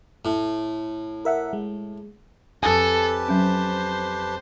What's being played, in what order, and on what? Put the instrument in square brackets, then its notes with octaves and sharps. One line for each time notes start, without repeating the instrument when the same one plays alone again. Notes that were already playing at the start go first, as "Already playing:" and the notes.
[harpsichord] A2
[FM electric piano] A#4 E5 F#5
G#3
[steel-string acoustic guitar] F2 G#5 [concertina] G4 B4 A5 [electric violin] A4 [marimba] D#6
[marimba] F#3 C#4 [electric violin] C5